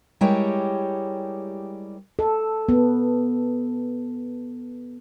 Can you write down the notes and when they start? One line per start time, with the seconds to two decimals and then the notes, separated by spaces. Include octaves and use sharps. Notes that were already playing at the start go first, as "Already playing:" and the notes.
0.21 G3 G#3 E4 G4 A#4 C#5
2.19 A4
2.69 B3